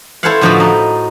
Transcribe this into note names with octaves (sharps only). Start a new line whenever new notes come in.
E4 A4 C5 C#5 F5 F#5
A2 D3 F3 F#4 D#5 B5
D#4